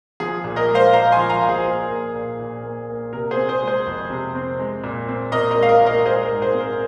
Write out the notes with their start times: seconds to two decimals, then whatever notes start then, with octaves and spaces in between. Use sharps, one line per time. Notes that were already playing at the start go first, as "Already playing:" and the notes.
0.20 F3 G#4
0.44 A#2
0.56 A#4 D#5
0.69 G#3
0.75 C5 F5
0.93 A#2 F5 A#5
1.12 G#5 C6
1.17 F3
1.29 F5 A#5
1.42 A#2
1.49 G#4
1.67 A#3
1.90 A#3
2.15 A#2
2.39 A#2
2.63 A#3
2.89 A#3
3.13 C3 A#4
3.31 G#4 C5
3.37 C4
3.49 G#4 C5
3.62 G#3
3.67 G#4 C5
3.86 F2
4.10 C3
4.35 C4
4.59 G#3
4.84 A#2
5.08 C4
5.32 A#2 A#4 D#5
5.51 A#4 D#5
5.56 G#3
5.63 F5
5.69 A#4 D#5
5.81 A#2
5.86 A#4 D#5
6.05 G#3 G#4 C5
6.23 A#4
6.29 G#2
6.42 G#4 C5
6.54 C4
6.61 A#4